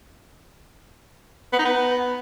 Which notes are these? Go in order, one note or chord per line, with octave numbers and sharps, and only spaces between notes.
B3
D#4
B3